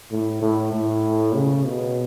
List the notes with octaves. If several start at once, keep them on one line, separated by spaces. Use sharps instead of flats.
A2
A2
A2
C#3
B2